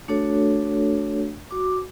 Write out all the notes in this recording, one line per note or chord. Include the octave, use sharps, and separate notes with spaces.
A3 D4 F#4 A4 C#5
F#4 D6